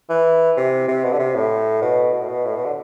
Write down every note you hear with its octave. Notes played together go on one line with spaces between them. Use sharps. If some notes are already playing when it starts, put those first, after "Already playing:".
E3
C3
C3
B2
D3
C3
A2
B2
B2
A2
B2
A2
B2
D3